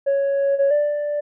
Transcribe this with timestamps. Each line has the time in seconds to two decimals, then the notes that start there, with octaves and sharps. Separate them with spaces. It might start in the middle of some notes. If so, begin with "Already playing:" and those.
0.06 C#5
0.59 C#5
0.71 D5